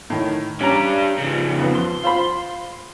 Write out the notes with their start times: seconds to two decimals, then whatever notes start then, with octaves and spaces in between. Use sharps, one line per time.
0.10 A2 D#3
0.61 C#4 D4 G4 A#5
1.19 C#3 F3
1.58 F2 B3
1.76 C6
2.04 F4 C5 B5